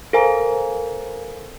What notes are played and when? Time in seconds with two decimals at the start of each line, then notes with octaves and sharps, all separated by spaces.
0.13 A4 A#4 C5 F5 G#5 A#5